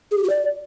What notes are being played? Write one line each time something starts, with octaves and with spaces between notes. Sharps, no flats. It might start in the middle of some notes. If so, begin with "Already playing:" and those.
G#4
G4
F#4
D5